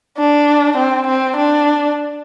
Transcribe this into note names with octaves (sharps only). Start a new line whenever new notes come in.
D4
C4
C4
D4